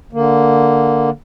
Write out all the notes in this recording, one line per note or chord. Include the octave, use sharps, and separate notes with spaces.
D3 A#3